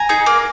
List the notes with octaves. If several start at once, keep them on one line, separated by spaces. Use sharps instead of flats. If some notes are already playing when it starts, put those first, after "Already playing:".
Already playing: G#5 A#5
D#4 G#4
A#3